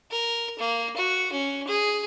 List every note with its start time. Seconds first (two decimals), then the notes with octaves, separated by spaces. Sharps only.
0.11 A#4
0.59 A#3
0.97 F#4
1.32 C#4
1.67 G#4